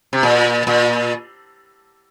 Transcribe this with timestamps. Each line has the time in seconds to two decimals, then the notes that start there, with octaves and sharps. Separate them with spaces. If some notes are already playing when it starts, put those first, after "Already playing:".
0.13 C3
0.23 A#2
0.67 A#2